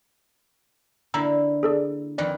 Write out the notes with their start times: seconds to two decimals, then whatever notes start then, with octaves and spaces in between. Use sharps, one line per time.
1.14 D3 A#3 E4 A#5 E6
1.63 G#4 A4 D5
2.18 F2 D#3 B4 D5